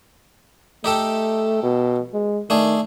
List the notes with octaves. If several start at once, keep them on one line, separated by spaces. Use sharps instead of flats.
A3 D#4 G4 A4
B2
G#3
D#3 A3 D4 G#4